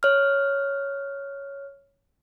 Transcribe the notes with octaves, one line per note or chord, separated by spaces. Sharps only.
C#5 F6